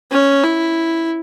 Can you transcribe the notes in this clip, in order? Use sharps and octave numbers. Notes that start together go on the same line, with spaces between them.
C#4
E4